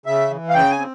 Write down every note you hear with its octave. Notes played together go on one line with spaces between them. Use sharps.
C#3 E5
E3
F5
C#3 G5
G#5
C4